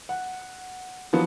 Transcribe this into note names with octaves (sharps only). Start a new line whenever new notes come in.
F#5
F3 F#3 B3